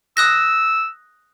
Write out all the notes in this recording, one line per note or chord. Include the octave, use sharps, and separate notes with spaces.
D#6 E6 F#6 A#6